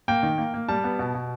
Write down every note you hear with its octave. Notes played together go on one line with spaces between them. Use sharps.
A#3 G5
D#3
A#3
A#3
G3 A5
B3
B2
B2